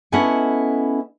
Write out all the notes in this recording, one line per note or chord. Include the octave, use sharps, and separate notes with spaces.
B3 C#4 E4 A4 D#5 F#5